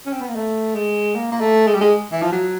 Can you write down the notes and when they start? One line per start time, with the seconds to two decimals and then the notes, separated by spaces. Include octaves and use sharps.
0.06 C#4
0.13 C4
0.20 B3
0.28 A#3
0.35 A3
0.75 G#3
1.15 A#3
1.32 A#3
1.40 A3
1.67 G#3
1.75 G3
1.81 G#3
2.12 E3
2.22 F3
2.32 F#3